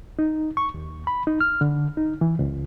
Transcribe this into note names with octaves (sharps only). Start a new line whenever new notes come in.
D#4
C#6
D#2
B5
D#4
F6
D3
D#4
E3
C#2